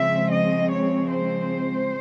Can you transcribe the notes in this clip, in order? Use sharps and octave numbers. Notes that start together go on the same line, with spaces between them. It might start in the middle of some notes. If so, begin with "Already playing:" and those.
Already playing: C#3 F3 G#3 C4 E5
D#5
C#5
C5